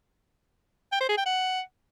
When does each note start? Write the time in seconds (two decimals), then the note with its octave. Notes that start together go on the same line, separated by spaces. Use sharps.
0.92 G5
1.01 C5
1.09 G#4
1.17 G5
1.26 F#5